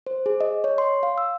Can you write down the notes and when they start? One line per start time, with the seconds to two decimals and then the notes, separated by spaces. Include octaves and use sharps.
0.07 C5
0.26 G#4
0.41 D#5
0.64 C#5
0.78 C6
1.03 F5
1.18 E6